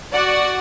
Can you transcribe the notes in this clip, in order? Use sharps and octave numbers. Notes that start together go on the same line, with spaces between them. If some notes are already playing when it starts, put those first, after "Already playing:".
F#4 D5 F#5